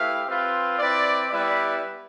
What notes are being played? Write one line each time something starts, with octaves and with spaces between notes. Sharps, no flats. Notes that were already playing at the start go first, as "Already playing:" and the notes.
Already playing: A3 E4 G4 B4 F5
C4 F4 B4
C4 E4 B4 D5
G3 B3 E4 B4 D5